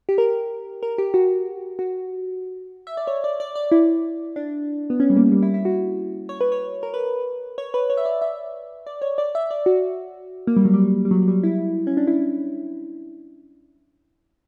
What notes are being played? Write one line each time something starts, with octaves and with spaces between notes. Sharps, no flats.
G4
A#4
A#4
G4
F#4
F#4
E5
D5
C#5
D5
D5
D5
E4
D4
B3
C#4
G3
A#3
G3
E4
E4
F#4
C#5
B4
C#5
A#4
B4
C#5
B4
C#5
E5
D5
E5
D5
C#5
D5
E5
D5
F#4
A#3
G3
F#3
G3
G3
F#3
F#3
G3
E4
C#4
D4
E4